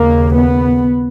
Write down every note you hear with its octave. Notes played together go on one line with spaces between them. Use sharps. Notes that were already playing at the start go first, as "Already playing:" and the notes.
Already playing: D#2 C#3 A#3
B3